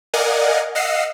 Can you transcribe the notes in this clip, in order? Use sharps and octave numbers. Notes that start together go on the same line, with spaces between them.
A#4 D5 D#5 F5 F#5 G#5
D#5 F5 F#5 E6 C7